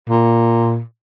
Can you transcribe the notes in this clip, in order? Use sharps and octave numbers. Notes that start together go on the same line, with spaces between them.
A#2